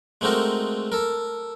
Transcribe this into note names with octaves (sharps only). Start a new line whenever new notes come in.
G#3 A3 C4 D#4 F#4 A#4
A4 A#4